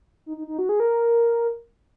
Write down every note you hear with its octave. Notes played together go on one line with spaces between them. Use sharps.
D#4
D#4
D#4
F#4
G#4
A#4